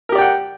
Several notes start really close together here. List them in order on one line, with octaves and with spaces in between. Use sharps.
A#4 G4 D5 G5 F#5